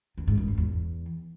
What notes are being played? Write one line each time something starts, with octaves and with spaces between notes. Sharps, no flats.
E2
G#2
F#2
F#2
E2